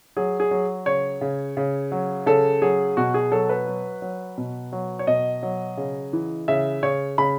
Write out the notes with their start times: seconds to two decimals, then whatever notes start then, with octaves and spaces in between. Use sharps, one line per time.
0.16 F#3 G#4
0.40 G#4
0.51 F#3
0.86 C#3 C#5
1.21 C#3
1.57 C#3
1.92 F#3
2.26 C#3 A4
2.62 F#3 G#4
2.97 B2 F#4
3.14 G#4
3.32 F#3 A4
3.49 B4
3.67 F#3
4.02 F#3
4.38 B2
4.73 F#3
4.99 C#5
5.07 B2 D#5
5.43 F#3
5.77 C#3
6.13 E3
6.48 C#3 E5
6.83 C#3 C#5
7.18 C#3 B5